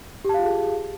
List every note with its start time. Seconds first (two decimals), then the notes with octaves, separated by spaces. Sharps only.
0.25 G4
0.29 A5
0.34 F5
0.39 F4
0.44 G#4